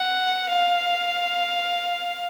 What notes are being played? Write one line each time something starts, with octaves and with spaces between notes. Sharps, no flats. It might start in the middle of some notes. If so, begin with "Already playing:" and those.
Already playing: F#5
F5